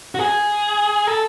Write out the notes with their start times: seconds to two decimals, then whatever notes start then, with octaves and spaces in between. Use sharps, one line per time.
0.15 F#4
0.19 G#4
1.07 A4